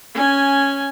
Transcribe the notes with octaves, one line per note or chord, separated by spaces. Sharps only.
C#4 G#5